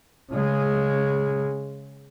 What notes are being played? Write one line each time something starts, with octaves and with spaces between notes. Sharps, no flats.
C#3 G#3